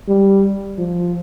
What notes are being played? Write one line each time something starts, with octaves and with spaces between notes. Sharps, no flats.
G3
F3